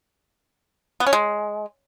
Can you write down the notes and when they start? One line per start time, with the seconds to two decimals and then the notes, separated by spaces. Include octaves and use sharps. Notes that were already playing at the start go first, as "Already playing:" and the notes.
1.00 B3
1.06 C#4
1.13 G#3